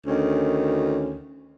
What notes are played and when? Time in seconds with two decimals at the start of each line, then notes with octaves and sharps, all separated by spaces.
0.07 D2 D#3 C#4